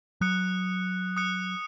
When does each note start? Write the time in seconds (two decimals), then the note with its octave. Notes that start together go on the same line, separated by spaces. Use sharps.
0.21 F#3 D#6 F#6 C#7
1.17 D#6 F#6 C#7